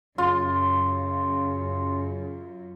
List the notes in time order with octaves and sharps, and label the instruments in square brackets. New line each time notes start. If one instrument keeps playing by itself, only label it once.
[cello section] F#2 [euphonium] C#3 [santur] F4 [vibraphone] C6